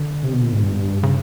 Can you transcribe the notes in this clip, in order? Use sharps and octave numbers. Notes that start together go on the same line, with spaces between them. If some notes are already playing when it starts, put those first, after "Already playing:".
Already playing: D3
C3
B2
A#2
G#2
G2
C#3